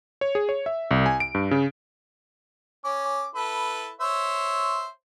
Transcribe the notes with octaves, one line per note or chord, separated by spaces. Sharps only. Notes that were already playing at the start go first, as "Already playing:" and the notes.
C#5
G#4
C#5
E5
C2
G#5
D7
G2
C#3
C#4 D6
E4 A4 B4
C5 C#5 E5